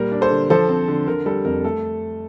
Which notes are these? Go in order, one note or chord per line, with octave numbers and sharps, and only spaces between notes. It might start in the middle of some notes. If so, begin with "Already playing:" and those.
Already playing: A#2 G3 A#4
D4
A4 C5
D3
F3 A4 C5
C4
D3
D3 A#4
G3 A4
F2 A#4
A3 A4